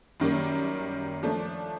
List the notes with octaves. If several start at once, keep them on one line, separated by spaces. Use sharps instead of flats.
F#2 D#3 G3 A#3
F3 A3 D4